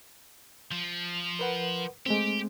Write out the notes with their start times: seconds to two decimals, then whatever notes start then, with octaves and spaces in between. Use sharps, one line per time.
0.72 F3
1.39 A#4 B4 F#5
2.06 G#3 A3 C4 G4